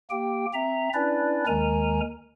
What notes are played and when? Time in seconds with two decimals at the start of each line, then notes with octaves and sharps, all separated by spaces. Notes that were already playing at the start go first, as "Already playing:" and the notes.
0.10 A#3 G4 G5
0.54 C4 E5 A#5
0.94 C#4 D4 E4 B4 D5
1.47 D#2 D#3 G#3 A#4 G#5 A#5